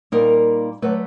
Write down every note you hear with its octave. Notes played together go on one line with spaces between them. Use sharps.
A#2 G3 A#3 D#4 A#4
D3 F#3 A3 B4